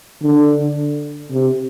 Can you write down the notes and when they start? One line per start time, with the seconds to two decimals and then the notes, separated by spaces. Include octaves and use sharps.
0.23 D3
1.32 C3